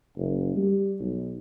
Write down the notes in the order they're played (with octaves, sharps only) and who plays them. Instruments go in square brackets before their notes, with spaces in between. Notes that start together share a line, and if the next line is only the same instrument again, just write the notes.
[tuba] F#1
G3
B1